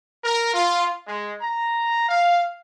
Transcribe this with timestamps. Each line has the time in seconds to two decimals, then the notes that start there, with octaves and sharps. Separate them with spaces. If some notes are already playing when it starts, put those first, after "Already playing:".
0.24 A#4
0.54 F4
1.08 G#3
1.42 A#5
2.09 F5